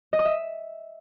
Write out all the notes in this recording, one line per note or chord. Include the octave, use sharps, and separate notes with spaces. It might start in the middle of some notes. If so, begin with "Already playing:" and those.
D#5
D#6
E5